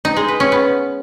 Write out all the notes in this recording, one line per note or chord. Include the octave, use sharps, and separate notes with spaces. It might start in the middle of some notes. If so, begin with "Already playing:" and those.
D#4
G#3
B4
C#4
B3